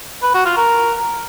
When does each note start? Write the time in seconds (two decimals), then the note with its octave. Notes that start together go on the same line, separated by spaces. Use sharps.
0.23 B4
0.34 F#4
0.46 F4
0.57 A#4